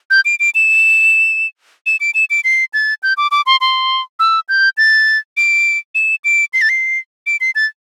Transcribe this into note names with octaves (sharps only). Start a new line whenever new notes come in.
G6
D7
D7
E7
E7
D7
E7
D7
C7
A6
G6
D6
D6
C6
C6
E6
G6
A6
D7
E7
D7
C7
A6
C7
D7
C7
A6